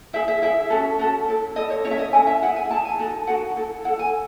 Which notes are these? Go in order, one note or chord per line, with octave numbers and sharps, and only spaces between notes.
E4 G#4 E5
E5
E4 G#4 E5
C#4 F#4 A4
C#4 F#4 A4
E4 A4
E4 A4 D#5
C#5
C#4 E4 A4 C#5
E5
D#5
C#4 E4 A4 G#5
E5
E4 G#4 F#5
G#5
E4 G#4 A5
G#5
D#4 F#4 A4
D#4 F#4 A4 F#5
E4 A4
E4 A4 F#5
G#5